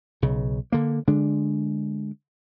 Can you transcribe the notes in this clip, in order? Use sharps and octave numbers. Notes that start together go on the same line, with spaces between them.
B1 C#3
D3 A#3
D3 G#3 D4